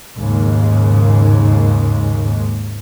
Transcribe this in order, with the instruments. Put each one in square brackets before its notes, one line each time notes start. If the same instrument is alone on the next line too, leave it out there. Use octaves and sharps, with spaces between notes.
[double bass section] D#2 G#2 C#3 G#3